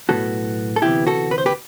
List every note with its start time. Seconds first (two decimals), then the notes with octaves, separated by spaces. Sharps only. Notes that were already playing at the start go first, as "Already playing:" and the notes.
0.09 B1 A2 E3 B3 F#4 A4
0.76 A4
0.82 D2 C3 E3 B3 E4 G4
1.07 F#4 A4
1.31 B4
1.38 C5
1.46 G4 B4